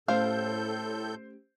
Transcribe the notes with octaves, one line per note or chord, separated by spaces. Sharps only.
A2 A3 C#4 G4 A4 C5 F5 G6